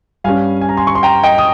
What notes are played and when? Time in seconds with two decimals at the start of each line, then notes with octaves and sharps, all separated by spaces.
0.24 G2 G3 C#4 F5 G#5
0.61 G#5
0.69 A#5
0.77 G#5 C6
0.87 C#6
0.95 C6
1.03 G5 A#5
1.23 D#5 G5
1.38 D#6